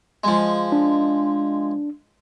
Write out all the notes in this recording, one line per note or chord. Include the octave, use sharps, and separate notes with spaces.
F3 G#3
D4